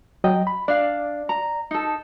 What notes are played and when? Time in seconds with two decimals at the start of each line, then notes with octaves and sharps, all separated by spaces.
0.24 F#3 D#5 G5
0.47 B5
0.68 D4 D5 F5
1.29 A#5
1.71 D#4 A4